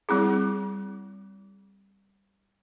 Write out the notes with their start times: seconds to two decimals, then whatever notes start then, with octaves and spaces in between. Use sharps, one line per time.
0.09 G3 C4 E4 G#4